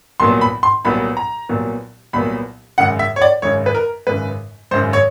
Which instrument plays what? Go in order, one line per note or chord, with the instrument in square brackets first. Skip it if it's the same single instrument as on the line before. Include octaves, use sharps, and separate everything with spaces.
[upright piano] C2 A#2 F#3 B3 C6
B5
C6
C2 A#2 F#3 B3 B5
A#5
C2 A#2 F#3 B3
C2 A#2 F#3 B3 B5
G#1 F#2 C#3 F#5
E5
C#5
D5
G#1 F#2 C#3 C#5
B4
A#4
G#1 F#2 C#3 B4
G#1 F#2 C#3 C5
C#5